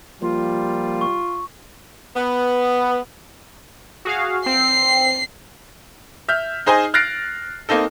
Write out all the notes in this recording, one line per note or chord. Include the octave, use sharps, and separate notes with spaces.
F3 G3 A#3 F4
C#6
B3
F#4 G#4 F5
C4 C7
E5 F6 G6
D#4 G#4 C5 D#5 G#5
F6 F#6 A6 A#6 C7 D7
A#3 C4 D#4 A4